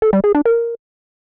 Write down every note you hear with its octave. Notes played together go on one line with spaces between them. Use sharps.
A4
G3
G#4
D4
A#4